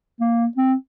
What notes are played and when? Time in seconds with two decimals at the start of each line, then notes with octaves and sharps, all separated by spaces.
0.20 A#3
0.57 C4